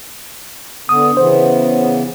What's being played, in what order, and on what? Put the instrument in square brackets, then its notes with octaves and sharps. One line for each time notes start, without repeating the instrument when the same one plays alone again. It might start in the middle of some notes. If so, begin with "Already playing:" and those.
[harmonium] D3 B3 [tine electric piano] D#6
[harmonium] C#3 E3 B3 [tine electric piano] C5